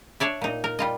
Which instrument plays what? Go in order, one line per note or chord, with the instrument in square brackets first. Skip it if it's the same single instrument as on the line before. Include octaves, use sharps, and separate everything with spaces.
[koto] D4 C#5 D5 E5
A#2 D#4
A#4
G3 F4 D#5